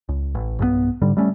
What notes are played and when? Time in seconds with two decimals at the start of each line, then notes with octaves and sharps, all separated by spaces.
0.09 C#2
0.35 A1
0.59 B1 G2 D#3 B3
1.02 G#2 D3 G3
1.17 G3 A3 C#4